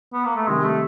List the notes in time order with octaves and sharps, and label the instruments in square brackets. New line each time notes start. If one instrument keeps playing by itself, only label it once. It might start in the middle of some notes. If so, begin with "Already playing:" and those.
[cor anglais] B3
A#3
A3
[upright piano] C3 D#3 G3 [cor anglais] G#3
[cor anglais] A3